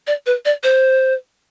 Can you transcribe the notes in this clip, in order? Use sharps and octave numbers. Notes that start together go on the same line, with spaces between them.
D5
B4
D5
C5